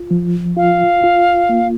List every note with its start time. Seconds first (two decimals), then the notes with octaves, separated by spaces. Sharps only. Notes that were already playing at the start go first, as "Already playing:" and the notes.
Already playing: F4
0.11 F3
0.57 F4 F5
1.04 F4
1.49 A#3